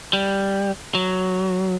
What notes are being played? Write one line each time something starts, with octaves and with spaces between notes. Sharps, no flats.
G3
F#3